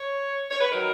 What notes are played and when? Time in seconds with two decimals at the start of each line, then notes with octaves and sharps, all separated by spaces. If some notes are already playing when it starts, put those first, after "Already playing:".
Already playing: C#5
0.51 C#5
0.61 B4
0.70 D#3 F#3 A#4